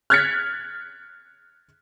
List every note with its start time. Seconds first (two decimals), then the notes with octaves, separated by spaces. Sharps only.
0.10 F6 F#6 G#6 A6 B6 C#7